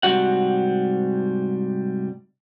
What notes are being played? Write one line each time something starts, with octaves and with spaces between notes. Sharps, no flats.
G#2 C3 G3 F#4 F#5